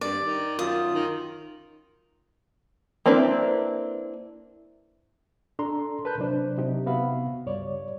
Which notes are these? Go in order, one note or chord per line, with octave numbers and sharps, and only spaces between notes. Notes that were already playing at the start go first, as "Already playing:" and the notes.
G2 D5
D#3
F#2 F4 D#6
D#3
A#3 C4 D4 E4 B4
D4 A4 A#5 C6
A#4 B4 A5 B5 F#6 G6
C3 F#3 D4 C5
C3 F#3 D#4 G4
C3 B3 F#4 E5 F5 B5
C#2 G2 G3 C#5 D5